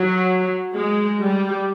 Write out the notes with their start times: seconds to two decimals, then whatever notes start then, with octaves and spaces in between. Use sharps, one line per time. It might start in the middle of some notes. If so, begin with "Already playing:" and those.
Already playing: F#3
0.75 G#3
1.22 G3